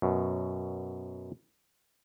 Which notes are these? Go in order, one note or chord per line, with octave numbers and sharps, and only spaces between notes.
F#2 B2